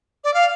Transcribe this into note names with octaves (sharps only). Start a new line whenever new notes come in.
D5
F5